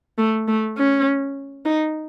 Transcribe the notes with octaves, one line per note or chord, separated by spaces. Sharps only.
A3
A3
C#4
D#4